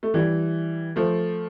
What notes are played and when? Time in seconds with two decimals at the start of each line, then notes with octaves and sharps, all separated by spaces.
0.03 A3
0.14 E3 G3
0.96 F3 A3